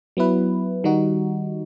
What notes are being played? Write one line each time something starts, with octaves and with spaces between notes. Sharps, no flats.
F#3 B3 E4 B4
D#3 G3 D#4 F#4